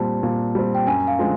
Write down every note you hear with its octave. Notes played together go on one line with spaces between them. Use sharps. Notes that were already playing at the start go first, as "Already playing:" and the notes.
Already playing: A#2 G3 C4 A5
A#2
G3 C4
G5
F#2 G#5
F5
D3 F3 G#3 C4